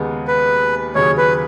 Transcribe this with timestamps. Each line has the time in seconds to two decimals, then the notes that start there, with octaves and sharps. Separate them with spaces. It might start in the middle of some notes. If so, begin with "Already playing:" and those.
Already playing: D#2 C#3 G#3 B3
0.28 B4
0.95 D#2 C#3 F#3 C#5
1.18 B4